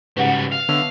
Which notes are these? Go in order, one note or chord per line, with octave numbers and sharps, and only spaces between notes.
G#2 C#3 G3 F#4 B4 F#5
F5
D3 B3 C#5 E5